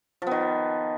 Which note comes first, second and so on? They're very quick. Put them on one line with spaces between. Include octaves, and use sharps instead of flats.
F3 B3 D#3